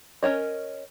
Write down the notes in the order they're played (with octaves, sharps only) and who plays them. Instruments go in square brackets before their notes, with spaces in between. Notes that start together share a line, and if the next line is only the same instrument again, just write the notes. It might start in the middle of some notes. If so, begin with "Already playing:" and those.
[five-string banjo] C#4 A#4 C#5 D#5